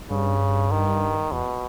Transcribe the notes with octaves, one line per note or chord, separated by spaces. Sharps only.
G2 C#3
D#3
E2 B2